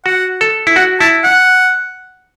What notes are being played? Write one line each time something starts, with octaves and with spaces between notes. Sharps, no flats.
F#4 F#5
A4
E4
F#4 F#5
E4 A5
F#5